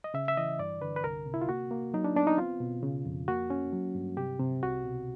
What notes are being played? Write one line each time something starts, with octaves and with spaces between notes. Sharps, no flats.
D#5
C#3 E5
E5
E3 D#5
G2 D5
D3 B4
B4
C2 A#4
C3
E4
F4
A#3 F#4
A#3
F#3 D#4
D4
B3 D4
D#4
C4 F4
B2
C#3
F2
A#3 F#4
C#4
F#3
G2
C3 G4
C3
C2 F#4
B2